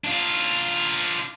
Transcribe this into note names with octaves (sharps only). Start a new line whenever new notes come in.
D4 F4